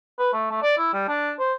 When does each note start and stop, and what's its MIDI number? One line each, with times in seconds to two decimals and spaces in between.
0.19 0.30 71
0.33 0.46 57
0.51 0.58 57
0.63 0.74 74
0.78 0.90 64
0.93 1.08 55
1.08 1.32 62
1.39 1.53 72